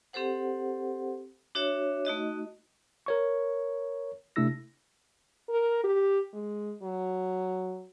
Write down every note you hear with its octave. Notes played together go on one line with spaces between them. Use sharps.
C4 G4 A4 C5 F#5
D4 F#4 C#5 E5
A3 D#4 F#4 D#5
A#4 C#5 C#6
C3 A3 D4 E4 E6 A#6
A#4
G4
G#3
F#3